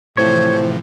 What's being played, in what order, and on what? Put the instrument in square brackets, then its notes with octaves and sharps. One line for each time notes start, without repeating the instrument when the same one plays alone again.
[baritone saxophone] A2 [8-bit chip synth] C3 E3 F3 [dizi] C5 [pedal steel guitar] C#5